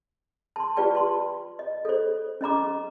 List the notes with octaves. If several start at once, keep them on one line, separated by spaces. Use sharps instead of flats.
A5 C6
F4 G4 B4 D5 G5 A5
A5 C6
D#5
A4 C5
C#4 D#5 A#5 D6